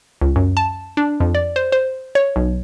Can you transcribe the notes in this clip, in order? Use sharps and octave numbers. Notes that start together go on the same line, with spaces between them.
C#2
F#2
A5
D4
F2
D5
C5
C5
C#5
B1